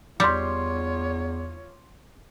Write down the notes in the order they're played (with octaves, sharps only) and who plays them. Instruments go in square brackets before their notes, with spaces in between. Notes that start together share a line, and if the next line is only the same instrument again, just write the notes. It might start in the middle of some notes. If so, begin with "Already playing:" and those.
[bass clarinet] E2 [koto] G3 [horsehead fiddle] F4 C#5 [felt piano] C6 D6